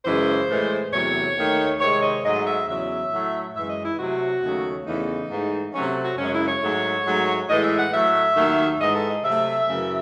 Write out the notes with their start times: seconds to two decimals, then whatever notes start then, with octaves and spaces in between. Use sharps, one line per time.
0.05 F#2 C#3 E3 G#3 C5
0.50 A2 E3 G#3
0.93 E2 C3 F#3 A3 C#5
1.37 D#2 D#3 A3
1.80 C3 D#3 G#3 C#5
2.03 D#5
2.24 G#2 F#3 A3 D#5
2.47 E5
2.68 E2 C#3 F#3 E5
3.11 A2 F#3 A3
3.56 F#2 E3 G#3 E5
3.70 D#5
3.85 E4
3.99 C3 F#3 A3 F#4
4.43 D#2 C#3 F#3 A3
4.87 E2 C#3 E3 A3 D#4
5.31 G#2 E3 A3
5.74 C3 F#3 A3 C#4
6.04 F#4
6.18 F#2 C#3 G#3 C#4
6.33 E4
6.47 C#5
6.63 G#2 F#3 A3
7.06 G#2 F#3 A3
7.49 A2 E3 G#3 D#5
7.64 E5
7.78 F#5
7.93 A2 F#3 A3 E5
8.37 D#2 D#3 F#3 A3
8.81 G#2 E3 G#3 D#5
8.95 A4
9.10 D#5
9.24 C3 F#3 A3 E5
9.68 F#2 C#3 E3